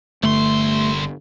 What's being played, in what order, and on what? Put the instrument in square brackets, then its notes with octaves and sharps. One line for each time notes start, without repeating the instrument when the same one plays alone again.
[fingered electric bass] G1 D3 [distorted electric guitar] C2 C6 [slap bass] A3